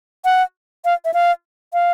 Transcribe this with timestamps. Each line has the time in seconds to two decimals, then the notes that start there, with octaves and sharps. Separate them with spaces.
0.25 F#5
0.85 F5
1.05 E5
1.14 F5
1.73 F5